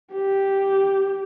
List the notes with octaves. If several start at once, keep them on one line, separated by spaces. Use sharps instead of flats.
G4